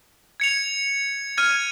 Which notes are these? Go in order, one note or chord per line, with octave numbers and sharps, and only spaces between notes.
G#6 C#7 F7
F6 G#6 D#7